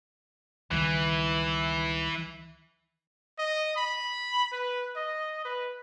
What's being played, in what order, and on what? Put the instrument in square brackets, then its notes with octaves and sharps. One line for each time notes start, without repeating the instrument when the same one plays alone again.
[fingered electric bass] C#2 D#3 G3 [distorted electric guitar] E3
[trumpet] D#5
B5
B4
D#5
B4